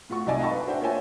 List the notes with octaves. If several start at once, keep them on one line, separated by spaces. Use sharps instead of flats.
A2 F4 F#4 C#6
C2 F#3 D#4 D5 E5 G#5
D#5 F5 G5 A5 B5 C#6
B4
D4 F#4 C5 E5 G5
A#3 F4 C#5 E5 G5 G#5